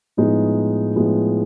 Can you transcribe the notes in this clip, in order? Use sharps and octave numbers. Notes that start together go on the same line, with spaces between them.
A2 F3 G#3 B3 D#4
A2 F3 G#3 B3 D#4